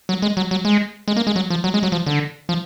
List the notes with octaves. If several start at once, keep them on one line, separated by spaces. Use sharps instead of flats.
F#3
G#3
F#3
F#3
G#3
G#3
A#3
G#3
F#3
F3
F#3
G#3
F#3
F3
D3
F3